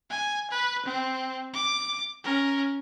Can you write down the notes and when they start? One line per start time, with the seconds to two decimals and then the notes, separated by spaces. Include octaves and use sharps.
0.10 G#5
0.51 B4
0.86 C4
1.53 D6
2.24 C#4 A#4